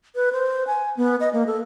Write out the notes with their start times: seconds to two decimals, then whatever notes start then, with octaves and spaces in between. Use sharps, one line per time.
0.15 B4
0.33 C5
0.67 G#5
0.97 B3
1.20 D#5
1.33 A#3
1.47 A4